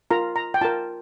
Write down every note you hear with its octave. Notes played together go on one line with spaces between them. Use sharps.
F4 A#4 A#5
A#5
G5
F4 A#4 A5